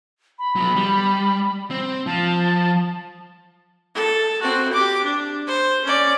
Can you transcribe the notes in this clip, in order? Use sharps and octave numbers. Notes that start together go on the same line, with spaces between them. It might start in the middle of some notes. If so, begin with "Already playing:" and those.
B5
F#3 B3
G3
C4
F3 A5
A4
C4 F#4
G4 D6
D4
C5
C#4 D5